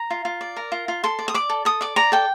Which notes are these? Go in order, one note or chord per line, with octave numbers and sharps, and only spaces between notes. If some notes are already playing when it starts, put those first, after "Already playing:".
Already playing: A#5
F4
F4
D5
A#4
F4
F4
A4 C6
D5
D#6
D5 D6
A4
A4 D#6
D5 D6
D5 A#5
A4 G5